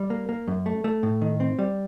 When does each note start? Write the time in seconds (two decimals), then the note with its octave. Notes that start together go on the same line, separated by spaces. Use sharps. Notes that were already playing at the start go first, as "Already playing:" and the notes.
Already playing: G3
0.10 A#3
0.29 A#3
0.48 F#2
0.66 A3
0.84 A3
1.03 A2
1.22 D#3
1.40 C4
1.59 G3